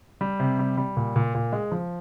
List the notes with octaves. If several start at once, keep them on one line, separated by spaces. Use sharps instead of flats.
G3
C3
G3
G3
A#2
A#2
A#2
G#3
F3